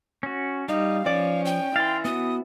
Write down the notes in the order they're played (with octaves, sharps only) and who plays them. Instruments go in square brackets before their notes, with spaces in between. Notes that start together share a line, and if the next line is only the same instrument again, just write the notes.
[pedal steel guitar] C#4 F#4
[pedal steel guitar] G3 [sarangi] D#4 [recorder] F5
[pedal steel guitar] F3 [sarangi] C#4 [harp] D5
[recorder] G5
[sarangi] E3 [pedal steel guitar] F5 C6 [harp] A6
[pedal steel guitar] B3 F#4 [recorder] D#6